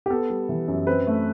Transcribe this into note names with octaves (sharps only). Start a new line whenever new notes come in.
G4
B3 A4
G3
E3
F#2
C4 B4
A3